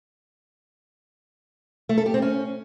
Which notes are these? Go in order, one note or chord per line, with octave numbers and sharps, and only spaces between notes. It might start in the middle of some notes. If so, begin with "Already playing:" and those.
A3
A4
G4
C4
C#4